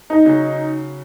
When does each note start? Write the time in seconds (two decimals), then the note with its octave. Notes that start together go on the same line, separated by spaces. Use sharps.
0.10 D#4
0.25 C#3 F#3 C#4